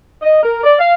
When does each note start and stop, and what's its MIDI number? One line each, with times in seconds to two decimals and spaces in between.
0.22 0.39 75
0.42 0.62 70
0.63 0.73 74
0.79 0.94 77